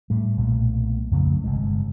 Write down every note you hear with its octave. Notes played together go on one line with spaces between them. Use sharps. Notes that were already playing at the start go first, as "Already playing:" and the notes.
A2 G3
B1 A#2 A3
F2 C#3 F#3 A3
G1 C3 G#3